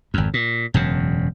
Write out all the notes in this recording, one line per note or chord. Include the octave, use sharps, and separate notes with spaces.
G#1 F2
A#2
E1 F#2 C#3